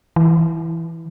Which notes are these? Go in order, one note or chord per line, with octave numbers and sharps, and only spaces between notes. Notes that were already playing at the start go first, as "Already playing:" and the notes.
E3